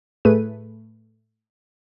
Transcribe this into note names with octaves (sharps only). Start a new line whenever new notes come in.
A2 A3 G#4 B4 D#7